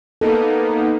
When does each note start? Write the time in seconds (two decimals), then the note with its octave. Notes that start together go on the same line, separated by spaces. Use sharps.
0.21 A#3 B3 D#4 A4